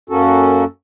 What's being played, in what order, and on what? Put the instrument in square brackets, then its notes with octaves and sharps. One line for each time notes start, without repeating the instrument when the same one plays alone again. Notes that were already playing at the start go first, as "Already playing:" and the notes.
[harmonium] F#2 A#3 C#4 F#4 A4